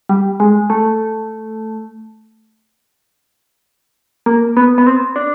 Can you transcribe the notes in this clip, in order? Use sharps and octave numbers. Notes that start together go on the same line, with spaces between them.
G3
G#3
A3
A#3
B3
B3
C4
D4